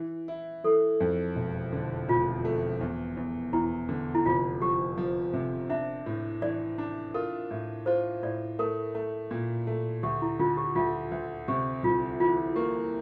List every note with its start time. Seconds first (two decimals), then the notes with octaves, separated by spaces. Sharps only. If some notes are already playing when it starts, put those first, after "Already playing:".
Already playing: E3
0.28 E4
0.64 E3 A4
1.00 F2
1.36 E1
1.73 D3
2.09 E1 F4
2.45 A3
2.81 E2
3.17 E2
3.53 E2 E4
3.89 D3
4.15 E4
4.26 F1 F4
4.61 F3 G4
4.97 F3
5.33 C3
5.70 D4 E5
6.06 A2
6.42 E3 D5
6.78 D4
7.14 F4 A#4
7.51 A2
7.86 F4 C5
8.23 A2 D5
8.59 A3 A#4
8.95 A3
9.31 A#2
9.67 A3
10.03 D2 G4
10.22 E4
10.39 D3 F4
10.57 G4
10.76 D2 F4
11.11 D2
11.48 C3 G4
11.83 C2 F4
12.20 E3 F4
12.56 A#3 G4